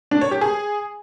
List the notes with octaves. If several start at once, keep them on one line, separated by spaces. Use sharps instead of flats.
D4
C#5
G4
G#4